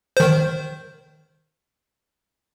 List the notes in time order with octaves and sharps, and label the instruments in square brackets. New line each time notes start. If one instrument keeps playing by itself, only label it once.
[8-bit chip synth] D#3 C5